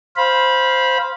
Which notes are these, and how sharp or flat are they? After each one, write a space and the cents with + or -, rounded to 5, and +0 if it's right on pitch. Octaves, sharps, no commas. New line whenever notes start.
C5 +0 F5 +0 B5 -20